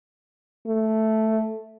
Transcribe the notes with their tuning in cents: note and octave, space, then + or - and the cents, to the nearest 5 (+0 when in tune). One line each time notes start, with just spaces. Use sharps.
A3 +0